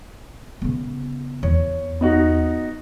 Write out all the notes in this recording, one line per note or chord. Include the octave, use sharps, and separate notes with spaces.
C#3 B3
E2 C#5
B3 D#4 F#4